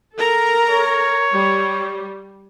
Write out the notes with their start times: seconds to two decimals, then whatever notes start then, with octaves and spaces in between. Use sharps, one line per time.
0.16 A4 A#4 A#5
0.71 C#5
1.34 G3